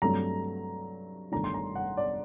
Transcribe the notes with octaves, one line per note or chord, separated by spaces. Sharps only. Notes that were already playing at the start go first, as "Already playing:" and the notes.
G2 F#3 A3 C4 A#5
G1 G2 D#3 A3 D4 A#5
C6
A#5
F#5
D5